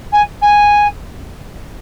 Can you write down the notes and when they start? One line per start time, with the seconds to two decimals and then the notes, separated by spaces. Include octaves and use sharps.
0.12 G#5
0.41 G#5